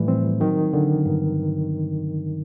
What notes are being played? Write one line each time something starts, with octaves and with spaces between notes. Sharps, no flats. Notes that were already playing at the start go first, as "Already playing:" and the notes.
Already playing: A2 E3 F3 G3 A3
C4
D#3 F#3
D3
G2